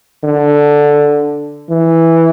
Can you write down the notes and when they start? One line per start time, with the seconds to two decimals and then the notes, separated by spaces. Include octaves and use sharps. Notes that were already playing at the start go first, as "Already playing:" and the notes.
0.24 D3
1.70 E3